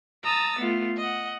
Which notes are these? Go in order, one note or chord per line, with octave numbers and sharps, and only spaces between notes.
A5 A#5 D#6 E6 A6
A3 B3 F4
D#5 F#5